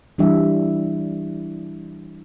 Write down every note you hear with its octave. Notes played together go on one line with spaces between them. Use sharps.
E3 G3 D4 E4 E5